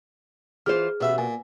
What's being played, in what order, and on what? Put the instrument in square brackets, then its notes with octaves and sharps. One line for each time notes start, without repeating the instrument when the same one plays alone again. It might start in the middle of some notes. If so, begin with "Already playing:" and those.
[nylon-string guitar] E3 F4 C5 [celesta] G#4 F6
[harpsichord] A1 E5 B5 [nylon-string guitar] B2
[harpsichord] A#2 [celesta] G#5